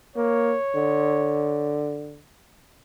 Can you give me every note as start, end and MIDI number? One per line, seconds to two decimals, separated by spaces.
0.16 0.55 58
0.16 1.77 73
0.75 2.21 50